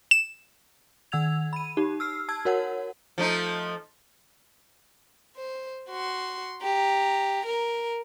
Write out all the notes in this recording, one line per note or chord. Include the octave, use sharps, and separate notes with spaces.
E7
D#3 F#5 E6 G#6 F7
B5 D#7
D#4 G4
E6 F6 C7
A5 E6 G#6
F#4 A#4 C#5 F#5
F3 A3 D#4
C5
F#4 C6
G4 A#5
A#4